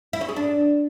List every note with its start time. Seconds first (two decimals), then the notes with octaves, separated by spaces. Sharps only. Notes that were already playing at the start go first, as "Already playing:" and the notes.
0.13 E4
0.21 C#4
0.29 G#4
0.36 D4